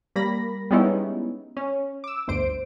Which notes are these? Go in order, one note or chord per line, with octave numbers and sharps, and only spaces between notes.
G3 A#3 B5 A#6
G3 G#3 B3 C#4 D#4 E4
C#4
D6 E6
G1 D2 C5 D7